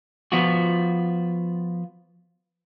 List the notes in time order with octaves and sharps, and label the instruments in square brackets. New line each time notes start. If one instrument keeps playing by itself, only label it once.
[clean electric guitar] F3 B3 F4 F#4